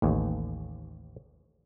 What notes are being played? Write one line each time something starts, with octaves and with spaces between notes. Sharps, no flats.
A1 D#2